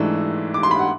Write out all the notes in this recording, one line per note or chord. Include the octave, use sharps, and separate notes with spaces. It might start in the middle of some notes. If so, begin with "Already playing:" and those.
Already playing: G#2 E3 A3 D4 E6
D6
C6
B5
F#5